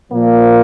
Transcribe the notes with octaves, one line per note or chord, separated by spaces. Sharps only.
A#2 F3 A#3